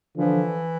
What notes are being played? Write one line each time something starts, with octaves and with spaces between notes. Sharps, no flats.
D3 E3 F3